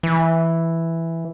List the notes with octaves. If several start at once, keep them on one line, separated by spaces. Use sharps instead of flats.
E3